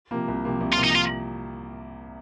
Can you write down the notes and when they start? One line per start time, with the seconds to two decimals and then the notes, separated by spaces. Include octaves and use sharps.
0.11 C3 F3 A#3
0.28 C2
0.45 C3 F3 A#3
0.60 C2
0.72 F4
0.78 C3 F3 A#3
0.84 D#4
0.95 F4